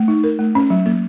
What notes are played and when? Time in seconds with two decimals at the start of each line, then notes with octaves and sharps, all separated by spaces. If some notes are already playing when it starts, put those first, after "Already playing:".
Already playing: A3
0.08 D#4
0.24 A#4
0.39 A3
0.55 C#4
0.70 F#3
0.86 A#3